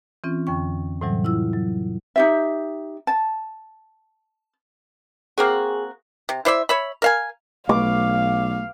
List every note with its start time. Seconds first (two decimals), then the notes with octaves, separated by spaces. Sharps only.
0.24 E3 C4 C#4 F4
0.47 F2 D3 G5 C#6
1.01 A2 C3 E3 F#3 G3
1.24 E4 F4 E6
1.53 F#3
2.16 D#4 G4 E5
3.07 A5
5.38 A#3 C4 F#4 G#4
6.29 C3
6.45 E4 C5 D5 E5
6.69 C#5 E5 B5
7.02 A#4 F5 G#5
7.69 B1 A3 F5 D6